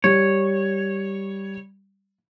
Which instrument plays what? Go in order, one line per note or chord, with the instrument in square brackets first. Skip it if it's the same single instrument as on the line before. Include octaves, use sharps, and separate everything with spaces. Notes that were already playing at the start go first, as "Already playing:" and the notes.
[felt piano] G3 [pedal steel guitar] C#5